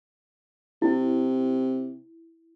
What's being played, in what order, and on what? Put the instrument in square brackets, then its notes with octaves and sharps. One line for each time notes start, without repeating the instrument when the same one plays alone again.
[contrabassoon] C3 [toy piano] E4